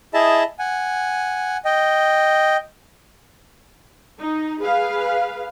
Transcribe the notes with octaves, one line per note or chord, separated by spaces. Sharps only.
E4 G#4 D#5 E5 A5
F#5 G#5
D#5 G5
D#4
G#4 B4 F5